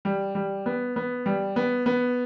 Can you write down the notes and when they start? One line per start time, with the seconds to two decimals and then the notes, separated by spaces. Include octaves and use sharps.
0.05 G3
0.35 G3
0.66 B3
0.96 B3
1.26 G3
1.56 B3
1.86 B3